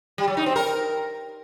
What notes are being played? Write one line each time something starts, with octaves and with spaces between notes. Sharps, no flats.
G3
F#3
D#4
C4
A#4